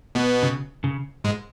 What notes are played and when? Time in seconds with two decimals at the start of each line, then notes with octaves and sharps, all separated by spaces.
0.15 B2 B3
0.43 C#3
0.84 C#3
1.24 G#2 G#3